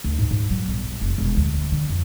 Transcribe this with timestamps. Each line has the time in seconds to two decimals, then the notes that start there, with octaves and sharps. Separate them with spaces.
0.04 D2
0.19 G#2
0.31 G#2
0.50 F#3
0.68 B1
1.01 F1
1.18 E1
1.37 D2
1.72 D3
1.89 F2